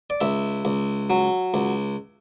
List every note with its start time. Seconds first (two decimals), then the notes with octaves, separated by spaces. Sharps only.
0.10 D5
0.21 C#2 E5
0.65 C#2
1.10 F#3
1.54 C#2